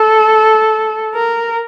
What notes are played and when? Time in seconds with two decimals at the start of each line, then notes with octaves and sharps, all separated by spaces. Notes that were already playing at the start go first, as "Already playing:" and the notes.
Already playing: A4
1.14 A#4